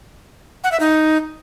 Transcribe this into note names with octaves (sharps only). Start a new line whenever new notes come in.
F#5
E5
D#4